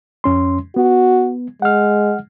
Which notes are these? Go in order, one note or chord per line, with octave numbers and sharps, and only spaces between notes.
F2 C#4 C6
B3 F#4
G#3 F#5 F6